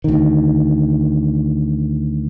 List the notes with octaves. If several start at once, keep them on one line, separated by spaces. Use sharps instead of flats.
D2 D#3